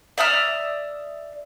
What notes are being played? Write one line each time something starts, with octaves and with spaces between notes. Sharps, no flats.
D5 E5 D#6 F6